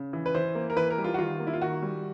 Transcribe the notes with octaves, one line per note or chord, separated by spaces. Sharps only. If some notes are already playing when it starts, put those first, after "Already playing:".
Already playing: C#3
E3
B4
E3 C5
A#3
A#4
E3 B4
A#4
G3
F4
F#4
D#3 F4
A#3
E4
F4
D#3 F#4
G3